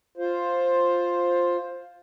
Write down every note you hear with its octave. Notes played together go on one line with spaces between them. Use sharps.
F4 C5